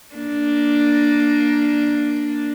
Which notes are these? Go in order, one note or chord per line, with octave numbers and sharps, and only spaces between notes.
A#3 D4